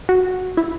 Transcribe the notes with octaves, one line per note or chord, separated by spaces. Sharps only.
F#4
E4